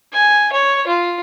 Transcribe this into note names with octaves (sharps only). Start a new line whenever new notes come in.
G#5
C#5
F4